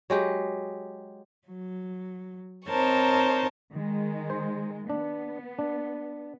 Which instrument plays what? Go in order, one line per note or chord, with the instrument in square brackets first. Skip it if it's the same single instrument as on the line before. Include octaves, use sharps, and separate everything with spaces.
[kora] F#3 G#3 G4
[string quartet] F#3
C4 D#4 A#4 C5 C#5 A5
[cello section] D#3 G#3
[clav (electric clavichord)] C5
[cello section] B3 [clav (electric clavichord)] D4
[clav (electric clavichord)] D4